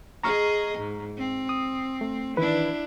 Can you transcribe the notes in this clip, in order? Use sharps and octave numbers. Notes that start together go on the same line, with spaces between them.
G#4 D#5 A#5 C#6 F6
G#2
C4
D#6
A3
D#3 E3 D4 E4 B4